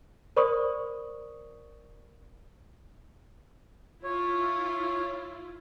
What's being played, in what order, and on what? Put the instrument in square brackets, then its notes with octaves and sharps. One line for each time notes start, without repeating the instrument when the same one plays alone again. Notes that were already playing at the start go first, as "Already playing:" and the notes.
[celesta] A#4 C5 D5 B5 C#6 D#6
[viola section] E4 F4 [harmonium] C#5